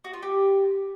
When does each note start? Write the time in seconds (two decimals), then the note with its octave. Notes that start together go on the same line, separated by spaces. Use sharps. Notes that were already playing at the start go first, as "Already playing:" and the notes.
0.04 F#4
0.13 F4
0.23 G4